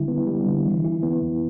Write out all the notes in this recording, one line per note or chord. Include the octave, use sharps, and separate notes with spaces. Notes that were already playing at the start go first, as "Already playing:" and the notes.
Already playing: D3 G3 E4
B3
G3
D3
E3
E4
B3
F2